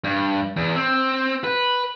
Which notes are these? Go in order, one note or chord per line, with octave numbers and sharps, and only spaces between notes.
G2
E2
C4
B4